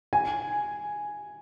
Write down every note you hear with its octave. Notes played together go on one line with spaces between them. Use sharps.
G#5